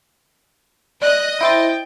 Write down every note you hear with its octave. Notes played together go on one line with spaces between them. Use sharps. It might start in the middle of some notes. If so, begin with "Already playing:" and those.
D5 D#5 F#6
E4 C5 G5 A6